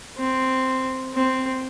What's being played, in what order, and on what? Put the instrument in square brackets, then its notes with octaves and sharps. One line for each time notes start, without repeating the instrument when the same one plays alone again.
[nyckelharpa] C4
C4